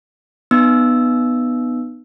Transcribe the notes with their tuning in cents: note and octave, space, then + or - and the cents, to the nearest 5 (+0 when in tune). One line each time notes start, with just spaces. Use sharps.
B3 +0 D#4 -30 E6 +0